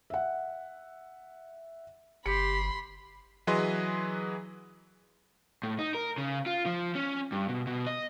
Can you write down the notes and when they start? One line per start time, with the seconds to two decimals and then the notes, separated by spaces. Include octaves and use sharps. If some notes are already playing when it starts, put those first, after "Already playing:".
0.10 E5 F#5
2.26 G1 G4 B5 C6 C#7
3.47 E3 F#3 G#4 B4 D#5 C6
5.63 A2
5.79 D#4
5.95 A#4
6.18 C#3
6.46 F4
6.66 F3
6.95 C#4
7.32 G2
7.49 B2
7.67 B2
7.86 D#5